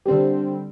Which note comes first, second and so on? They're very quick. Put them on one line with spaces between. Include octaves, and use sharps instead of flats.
G3 C4 D3